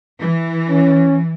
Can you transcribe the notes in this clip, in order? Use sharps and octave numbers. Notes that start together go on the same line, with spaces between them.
E3
C#4